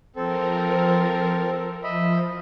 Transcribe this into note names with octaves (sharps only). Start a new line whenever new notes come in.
F3 C4 A4 A#4
F3 D#5 E5 B5